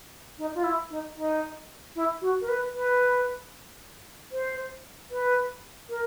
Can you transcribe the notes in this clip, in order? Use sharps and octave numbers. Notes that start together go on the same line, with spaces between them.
D#4
F4
E4
D#4
D#4
E4
F#4
A#4
B4
B4
C5
B4
A#4